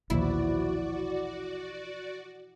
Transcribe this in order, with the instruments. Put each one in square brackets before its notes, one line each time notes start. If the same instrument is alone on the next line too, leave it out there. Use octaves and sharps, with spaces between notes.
[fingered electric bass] A#1 D#2 [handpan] B2 E3 F3 [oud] E4 [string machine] F#4 D5